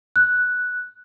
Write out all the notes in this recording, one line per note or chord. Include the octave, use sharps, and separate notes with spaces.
F#6